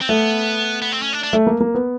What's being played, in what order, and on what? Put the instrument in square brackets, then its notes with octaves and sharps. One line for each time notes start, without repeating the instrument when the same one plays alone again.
[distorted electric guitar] C4
[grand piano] A3 [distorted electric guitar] B3
[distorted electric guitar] B3
C4
C#4
D4
D4
[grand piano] A3
A#3
A#3
B3